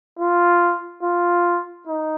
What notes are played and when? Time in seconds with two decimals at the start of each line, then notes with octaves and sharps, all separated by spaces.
0.19 F4
1.03 F4
1.87 D#4